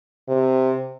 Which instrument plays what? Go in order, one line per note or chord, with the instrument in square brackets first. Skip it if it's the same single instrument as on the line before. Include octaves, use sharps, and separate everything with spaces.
[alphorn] C3